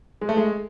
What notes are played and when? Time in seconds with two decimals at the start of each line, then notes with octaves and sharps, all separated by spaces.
0.21 G#3
0.29 A3
0.37 G#3